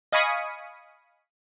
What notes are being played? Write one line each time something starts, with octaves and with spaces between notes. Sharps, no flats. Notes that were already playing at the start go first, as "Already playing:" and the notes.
D#5 F5 G#5 B5 C#6 D#6